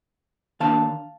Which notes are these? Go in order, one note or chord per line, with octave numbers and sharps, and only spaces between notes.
D#3 A#3 D4 F5 A5